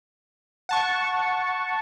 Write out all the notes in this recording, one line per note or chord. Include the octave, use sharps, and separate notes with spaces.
F#5 A5 C#6